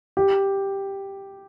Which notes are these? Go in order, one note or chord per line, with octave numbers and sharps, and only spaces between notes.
G4